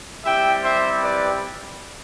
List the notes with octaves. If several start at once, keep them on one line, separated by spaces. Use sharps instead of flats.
G3 C4 E4 G4 E5 G5
C5 E5
B4 D5